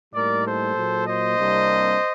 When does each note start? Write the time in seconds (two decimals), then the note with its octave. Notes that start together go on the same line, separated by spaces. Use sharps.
0.13 A2 G3 A#3 D#4 A#4 D5
0.44 A4 C5
0.75 A#2 F#3 A#3
1.06 C5 D#5
1.36 C2 C3 G3 A#3 D4